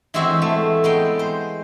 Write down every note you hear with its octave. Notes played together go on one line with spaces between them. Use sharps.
E3 G#3 C4 F#4 C5 E5
A3
G#3 B3 G5
C5